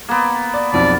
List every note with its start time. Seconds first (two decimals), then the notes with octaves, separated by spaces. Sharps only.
0.09 A#3 B3
0.54 D5
0.73 B1 F2 D5